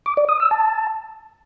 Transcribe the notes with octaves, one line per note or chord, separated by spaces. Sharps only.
D6
D5
D#6
E6
A5